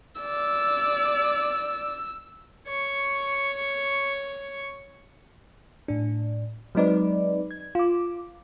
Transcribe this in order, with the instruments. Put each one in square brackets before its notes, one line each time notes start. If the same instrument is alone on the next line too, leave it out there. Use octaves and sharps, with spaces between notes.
[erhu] D5 [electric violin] E6
[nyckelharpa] C#5 C#6
[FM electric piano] A2 D4
F#3 G#3 C4 D#4 B4 D5
G#6
F4 D6